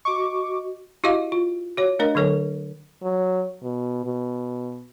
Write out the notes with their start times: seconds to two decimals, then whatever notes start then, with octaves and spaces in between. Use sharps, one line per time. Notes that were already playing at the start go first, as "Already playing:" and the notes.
0.05 F#4 D#5 C#6 D6
1.04 E4 F#4 G4 D#5 F5
1.32 F4
1.77 F#4 C#5
1.99 A3 D4 A#4 D#5
2.15 D3 F#3 A4 C#5
3.03 F#3
3.62 B2
4.05 B2